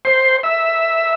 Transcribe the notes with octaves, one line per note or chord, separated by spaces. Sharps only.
C5
E5